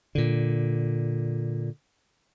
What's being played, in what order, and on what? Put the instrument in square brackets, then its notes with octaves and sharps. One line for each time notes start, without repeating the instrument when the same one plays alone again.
[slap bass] A#2 D3